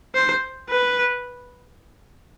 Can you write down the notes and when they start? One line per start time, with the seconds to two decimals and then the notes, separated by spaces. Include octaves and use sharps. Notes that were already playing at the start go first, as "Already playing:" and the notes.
0.15 C5
0.69 B4